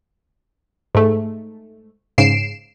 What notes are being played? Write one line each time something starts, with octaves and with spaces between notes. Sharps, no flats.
G#2 A3
G#2 C#3 C7 D7 E7